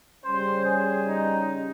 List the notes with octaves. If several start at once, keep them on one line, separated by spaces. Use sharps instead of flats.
C#3 G3 C#4 C5
G#4
D#4